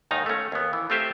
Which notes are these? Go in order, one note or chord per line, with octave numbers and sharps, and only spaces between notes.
D#2 G#2 D#3 D#4 A#5
A3 C#4
D#2 B3
E3
A3 C4 F4 G4 C5 E5